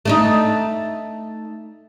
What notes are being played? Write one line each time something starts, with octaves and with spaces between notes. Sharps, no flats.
A3 D4 D#4